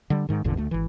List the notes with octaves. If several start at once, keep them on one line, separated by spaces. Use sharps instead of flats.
D3 G3
G#2 D#3
G#1 E2 A#2 D3
D2 A3
G#1 E3